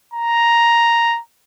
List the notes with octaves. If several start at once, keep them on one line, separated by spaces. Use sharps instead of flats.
A#5